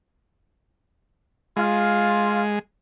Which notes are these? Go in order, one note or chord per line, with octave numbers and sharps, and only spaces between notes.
G#3 F4